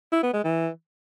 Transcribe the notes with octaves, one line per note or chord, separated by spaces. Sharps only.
E4
B3
G#3
E3